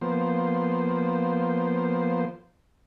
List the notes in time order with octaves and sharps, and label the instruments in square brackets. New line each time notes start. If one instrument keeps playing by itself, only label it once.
[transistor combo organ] F3 A#3 B3 C5